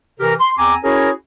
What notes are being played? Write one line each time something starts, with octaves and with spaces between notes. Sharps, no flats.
C3 E3 G4 A#4
C6
E2 C4 G#5 A#5 D6
C#4 E4 F#4 G#4 A#4 C#5